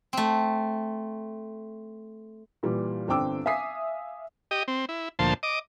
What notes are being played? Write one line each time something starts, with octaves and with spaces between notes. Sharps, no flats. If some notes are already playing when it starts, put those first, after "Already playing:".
A3 C4
A#2 E3 G3
G1 C4 D4 G5 D6 E6
E5 F5 G#5 D#6 B6 C7
G4 D#5
C4
E4
D2 A#2 F3 C5 A5
D#5 D6